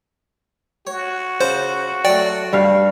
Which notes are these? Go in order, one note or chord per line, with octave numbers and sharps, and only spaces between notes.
F#4 C#5
C#3 F4 C5
F#3 A3 D5 G5
G2 G3 F5